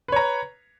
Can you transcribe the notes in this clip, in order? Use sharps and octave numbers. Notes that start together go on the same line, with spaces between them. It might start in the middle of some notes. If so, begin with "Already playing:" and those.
B4 C#5 A#5